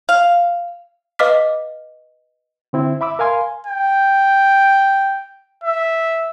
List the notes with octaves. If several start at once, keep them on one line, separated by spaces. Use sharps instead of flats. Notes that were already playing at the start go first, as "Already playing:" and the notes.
F5
B4 D#5 F5 D6 F6 B6
D3 C4 E4
E5 B5 D6 E6
A#4 F5 G#5 C6
G5
E5